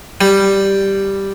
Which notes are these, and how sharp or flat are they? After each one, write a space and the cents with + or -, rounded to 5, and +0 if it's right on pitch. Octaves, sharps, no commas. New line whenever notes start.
G3 +0